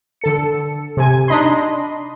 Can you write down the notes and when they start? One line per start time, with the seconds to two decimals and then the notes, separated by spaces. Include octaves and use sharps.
0.21 D3 A4 C#7
0.97 C3 G#5
1.28 D4 D#4 D#5 B5 C6